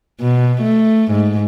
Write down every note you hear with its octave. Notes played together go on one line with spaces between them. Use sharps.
B2
A3
G#2